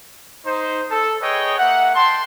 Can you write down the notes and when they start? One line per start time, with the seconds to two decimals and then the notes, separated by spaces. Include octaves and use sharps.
0.46 D#4 C5
0.91 A4
1.22 G#4 B4 C#5 D#5 G5
1.58 A#3 E5 F#5
1.95 G5 A5 C6